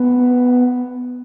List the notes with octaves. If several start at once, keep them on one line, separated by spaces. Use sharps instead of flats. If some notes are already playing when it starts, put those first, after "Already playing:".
Already playing: B3